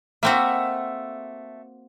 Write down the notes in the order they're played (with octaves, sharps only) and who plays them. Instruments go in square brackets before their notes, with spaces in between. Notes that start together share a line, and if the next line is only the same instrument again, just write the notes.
[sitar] A3 E5 [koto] A#3 C4 F#4